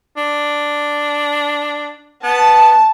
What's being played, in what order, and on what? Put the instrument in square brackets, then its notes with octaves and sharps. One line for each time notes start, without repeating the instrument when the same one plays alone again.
[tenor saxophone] D4
[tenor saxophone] B3 [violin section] A5